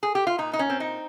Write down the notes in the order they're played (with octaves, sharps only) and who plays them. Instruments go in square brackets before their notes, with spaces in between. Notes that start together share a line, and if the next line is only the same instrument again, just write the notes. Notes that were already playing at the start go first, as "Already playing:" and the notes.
[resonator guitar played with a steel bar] G#4
G4
F4
A#2 D#4
D#4
C#4
C4
D#4